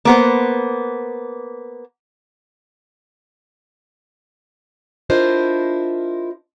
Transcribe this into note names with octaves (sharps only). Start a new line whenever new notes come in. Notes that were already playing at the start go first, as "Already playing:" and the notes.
A#3 B3 C5
D4 E4 F4 A#4 C5 D#5